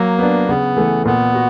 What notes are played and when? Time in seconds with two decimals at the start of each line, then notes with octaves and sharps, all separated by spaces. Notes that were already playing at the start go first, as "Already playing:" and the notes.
Already playing: F#3 A#3
0.19 B3 D4
0.48 C#3 B3
0.77 E3 A3
1.05 A#2 B3
1.35 F#4